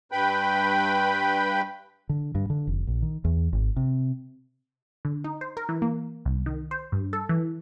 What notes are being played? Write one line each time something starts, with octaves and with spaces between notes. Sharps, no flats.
G2 B4 G5 B5
D3
G2
D3
F1
A#1
D#3
E2
G#1
C3
D3
D#4
C5
A#4
E3
A#3
C2
D#3
C5
G2
A4
E3